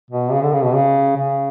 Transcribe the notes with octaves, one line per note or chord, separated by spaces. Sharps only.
B2
C#3
D3
C#3
B2
C#3
C#3